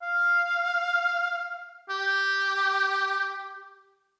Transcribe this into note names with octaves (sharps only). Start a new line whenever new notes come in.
F5
G4